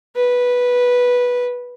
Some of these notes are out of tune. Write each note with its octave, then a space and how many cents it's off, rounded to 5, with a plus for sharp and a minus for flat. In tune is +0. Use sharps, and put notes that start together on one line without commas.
B4 -10